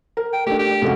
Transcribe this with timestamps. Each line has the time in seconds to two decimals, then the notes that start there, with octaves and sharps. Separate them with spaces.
0.17 A#4
0.33 G5
0.47 A3 D4 G4
0.59 G4
0.82 F1 C#2 F#4